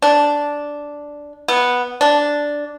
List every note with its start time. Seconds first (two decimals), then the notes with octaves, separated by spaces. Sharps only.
0.02 D4
1.48 B3
2.01 D4